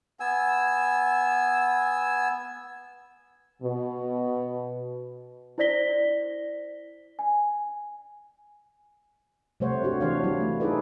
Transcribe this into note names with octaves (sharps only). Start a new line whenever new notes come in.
B3 G#5 E6
B2
E4 C5 D5 A#6 B6 G7
G#5
C3 G3 A3 C5 C#5 F#5
D4 F#4 G4
E3 D4 C#5 F5
F#3 G3 E4
A3
D#4 E4 G#4 A4 B4 D5